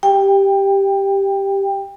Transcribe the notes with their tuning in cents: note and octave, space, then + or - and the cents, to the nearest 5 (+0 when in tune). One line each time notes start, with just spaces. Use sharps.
G4 +0 G5 +20